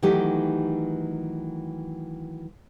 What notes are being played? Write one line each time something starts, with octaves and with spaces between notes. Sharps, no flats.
D#3 E3 F#3 A3 D#4 G4